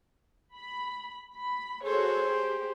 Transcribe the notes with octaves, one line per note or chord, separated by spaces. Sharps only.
B5
B5
F#4 G#4 A4 C5 C#5
G4